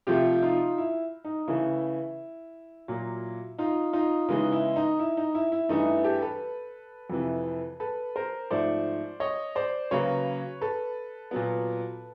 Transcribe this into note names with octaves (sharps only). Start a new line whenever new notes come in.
C3 F3 A3 F4 G4
D#4 F4
E4
D#4
C#3 E3 A3 E4
A#2 F#3 A#3
D#4 F4
D#4 F4
C#3 E3 G#3 B3 D#4
E4
D#4
E4
D#4
E4
E4
G2 E3 A3 D#4
E4
G4 A4
A4 B4
F2 C3 E3
A4 B4
A#4 C5
G#2 F3 A3 C5 D5
C#5 D#5
C5 D5
C#3 F#3 A#3 B4 C#5
A4 B4
A#2 F#3 B3